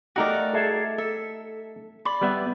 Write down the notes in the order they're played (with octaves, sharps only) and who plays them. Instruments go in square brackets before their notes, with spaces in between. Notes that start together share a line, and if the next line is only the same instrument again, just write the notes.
[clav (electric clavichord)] A3 D#4 G4 [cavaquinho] F#4 A#4 D5
[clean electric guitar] G#4 A4 E5
[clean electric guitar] A4 [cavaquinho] E5
[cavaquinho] D5 [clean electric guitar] B5
[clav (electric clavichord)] G3 B3 E5